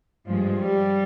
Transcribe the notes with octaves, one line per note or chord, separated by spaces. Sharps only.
G2 F3 G#3
G3